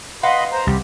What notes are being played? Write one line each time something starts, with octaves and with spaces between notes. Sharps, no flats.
B4 D#5 F5 F#5 B5 C6
C5 A#5
C2 G4